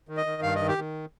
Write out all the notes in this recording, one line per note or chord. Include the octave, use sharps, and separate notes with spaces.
D#3
D#5
D#3
G2 F5
D#3 D#5
G4
D#3